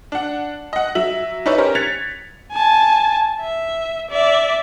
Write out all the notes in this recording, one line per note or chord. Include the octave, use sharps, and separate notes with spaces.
D4 F#5
D#5 F#5
F#3 E5 F#7
D#4 E4 B4 C#5 D5 E5
C#4 G4 A#4 C5 C#5
F#6 G#6 A6 B6 C#7 F7
G#5 A5
E5
D5 E5